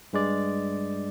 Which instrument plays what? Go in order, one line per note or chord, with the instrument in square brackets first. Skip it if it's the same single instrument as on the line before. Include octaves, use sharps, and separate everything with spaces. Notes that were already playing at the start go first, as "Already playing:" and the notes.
[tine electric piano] G2 G#3 D5